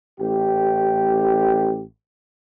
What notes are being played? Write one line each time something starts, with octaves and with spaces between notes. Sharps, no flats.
A1 G4